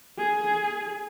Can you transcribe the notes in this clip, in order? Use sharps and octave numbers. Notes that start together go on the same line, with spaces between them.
G#4